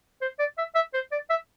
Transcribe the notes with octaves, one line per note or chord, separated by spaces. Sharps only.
C5
D5
E5
E5
C5
D5
E5